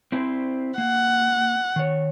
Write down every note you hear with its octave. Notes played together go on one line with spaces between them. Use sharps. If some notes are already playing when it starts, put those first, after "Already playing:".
C4 E4 C5
A#3 F#5
D#3 C#5